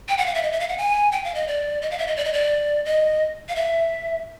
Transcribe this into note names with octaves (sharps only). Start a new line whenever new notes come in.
G5
F#5
F5
E5
D#5
E5
F5
F#5
G#5
G5
F5
D#5
D5
D#5
F5
E5
D#5
D5
D#5
D5
D#5
F5
E5